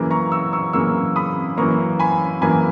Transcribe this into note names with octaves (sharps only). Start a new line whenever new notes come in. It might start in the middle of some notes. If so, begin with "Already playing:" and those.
Already playing: F#2 C#3 E3 A#3
A#5 C#6
C#6 E6
C#6 E6
F#2 C#3 E3 A#3 C#6 E6
B5 D#6
F#2 E3 A#3 A#5 C#6
G#5 B5
F#2 E3 A#3 G#5 B5